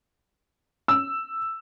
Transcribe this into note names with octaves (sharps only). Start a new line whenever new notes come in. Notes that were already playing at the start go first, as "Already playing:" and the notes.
E6